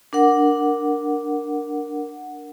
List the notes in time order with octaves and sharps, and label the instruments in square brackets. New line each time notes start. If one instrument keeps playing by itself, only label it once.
[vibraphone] D4 A#4 F#5